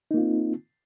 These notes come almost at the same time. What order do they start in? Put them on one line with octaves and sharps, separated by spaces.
D#4 A#3 F4 C4